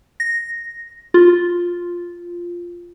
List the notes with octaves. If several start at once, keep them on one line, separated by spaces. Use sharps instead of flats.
A#6
F4